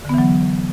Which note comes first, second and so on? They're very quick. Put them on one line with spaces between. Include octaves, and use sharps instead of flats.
D3 B3 E3 F#3